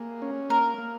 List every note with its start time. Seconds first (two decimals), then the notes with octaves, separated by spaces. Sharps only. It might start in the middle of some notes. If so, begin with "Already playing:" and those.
Already playing: A#3 G#4
0.22 C#4
0.50 A#3 A#4
0.78 A#3